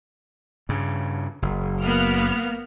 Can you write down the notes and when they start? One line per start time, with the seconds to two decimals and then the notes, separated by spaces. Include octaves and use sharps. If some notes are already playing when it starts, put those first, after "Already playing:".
0.69 G2 C#3
1.42 F#1
1.83 A#3 B3 F6